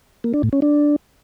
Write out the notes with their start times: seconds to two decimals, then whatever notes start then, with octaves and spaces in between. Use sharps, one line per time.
0.24 A#3
0.34 D4
0.43 A2
0.53 C#4
0.62 D4